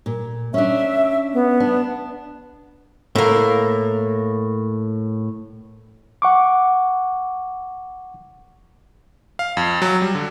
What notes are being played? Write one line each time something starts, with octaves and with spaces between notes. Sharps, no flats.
A#2
C#4 D4 E5
B3
D4
A2 A#3
F#5 C#6 D6
F5
F2
F#3
G3
D3